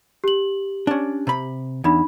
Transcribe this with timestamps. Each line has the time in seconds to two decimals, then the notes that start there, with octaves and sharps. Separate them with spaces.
0.24 G4 F#7
0.87 C#4 D4
1.27 C3 B5
1.84 E2 D4 D#4 B5